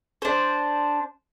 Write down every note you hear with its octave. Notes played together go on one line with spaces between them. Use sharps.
D4 C5